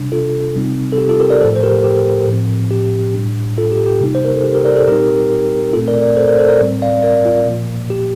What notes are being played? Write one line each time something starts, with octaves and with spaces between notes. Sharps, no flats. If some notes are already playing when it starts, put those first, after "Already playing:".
Already playing: C3 G3 D4
F4 A4
C3 G3 C4 D#4
A4
G4
F4 A4
G4 A#4
A#4 D5
A2 F3 A3 A4 C5
C5
G4 A#4
G4
A2 F3 C4
G4
A2 G3 D4
F4 A4
G4
G4
C3 G3 A#3 D#4
C5
A#4
A4
G4
G4 A#4
A#4 D5
A4 C5
A#2 G3 C4 D#4 G4 A#4
A#2 A3 C4 F4 A4
A#4 D5
A#4 D5
A4 C5
A#4 D5
A4 C5
A#4 D5
A2 G3 C4
D5 F5
A#4 D5
F4
A#2 F3 A#3
G4